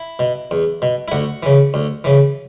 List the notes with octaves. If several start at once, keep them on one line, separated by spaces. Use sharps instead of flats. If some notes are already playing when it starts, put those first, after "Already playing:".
Already playing: E4
B2
E2
B2
E4
D2 F#4
C#3 E3
D2
C#3 E3